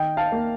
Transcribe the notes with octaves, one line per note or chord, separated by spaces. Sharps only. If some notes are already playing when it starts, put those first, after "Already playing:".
Already playing: D#3 D#5 G5
F5 A5
A#3